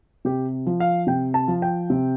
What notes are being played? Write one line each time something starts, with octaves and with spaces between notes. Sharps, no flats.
C3 G4
F3
F5
C3 G5
A5
F3
G5
C3